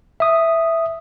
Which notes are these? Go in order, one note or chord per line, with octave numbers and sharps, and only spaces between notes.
E5 D#6